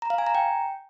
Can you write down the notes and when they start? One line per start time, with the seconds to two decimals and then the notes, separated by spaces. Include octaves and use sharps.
0.02 A#5
0.10 F5
0.18 G#5
0.26 A#5
0.35 G5